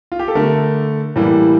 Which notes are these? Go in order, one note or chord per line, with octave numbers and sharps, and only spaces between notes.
F4
G4
A4
D3 A3 A#4
A2 E3 G3 A#3